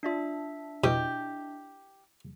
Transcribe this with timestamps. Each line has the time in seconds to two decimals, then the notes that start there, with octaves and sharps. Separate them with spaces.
0.03 D4 F4 D5 E5 B6
0.84 B2 E4 G4 D#5